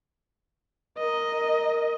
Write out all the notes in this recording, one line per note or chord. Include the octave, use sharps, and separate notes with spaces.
A#4 D#5